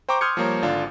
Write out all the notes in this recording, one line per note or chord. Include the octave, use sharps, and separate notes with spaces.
C5 G5 A#5 C#6 D6
C6 D#6 F6 G6 G#6 C#7
F3 G3 A#3 C#5 A#5
G#1 D3 D4 F4